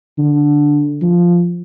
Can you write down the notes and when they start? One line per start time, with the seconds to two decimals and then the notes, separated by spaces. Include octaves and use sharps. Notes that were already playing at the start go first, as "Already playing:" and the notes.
0.18 D3
1.02 F3